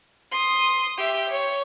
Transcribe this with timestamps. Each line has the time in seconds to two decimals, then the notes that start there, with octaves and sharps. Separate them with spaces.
0.32 C6 D#6
0.98 G4 E5
1.30 C#5